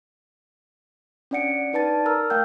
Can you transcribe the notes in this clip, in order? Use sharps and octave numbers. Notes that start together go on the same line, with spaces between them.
C#4 D4 D5 F#5 C#7 D7
D#4 B4 D5 A5 A6
A#4 A#5 E6 F6
A3 A#4 F5 G5 E6 G6